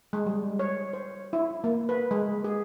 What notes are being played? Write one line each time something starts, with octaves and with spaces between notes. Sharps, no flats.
G#3
G3
C#5
C5
E4
A#3
B4
G#3
G#4